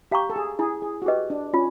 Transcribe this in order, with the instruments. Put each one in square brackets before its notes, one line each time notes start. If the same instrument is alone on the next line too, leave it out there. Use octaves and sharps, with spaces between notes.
[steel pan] G4 [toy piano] F5 A#5 C#6
[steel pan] A4
G#4
[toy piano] E4 [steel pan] G#4
[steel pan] G#4
F#4
[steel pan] G4 [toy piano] G#4 B4 D#5
[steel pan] D4
[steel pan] C#4 [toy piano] F4